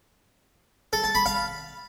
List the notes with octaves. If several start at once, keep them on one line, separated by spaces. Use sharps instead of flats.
A4
A5
B5
F5